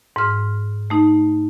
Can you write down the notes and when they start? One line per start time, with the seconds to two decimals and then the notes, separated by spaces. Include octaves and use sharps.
0.16 G#2 F6
0.90 A3 D#4